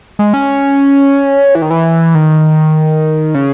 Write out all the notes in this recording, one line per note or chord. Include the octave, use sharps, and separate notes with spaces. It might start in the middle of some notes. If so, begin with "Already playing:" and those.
G#3
C#4
E3
D#3
E3
D#3
C#3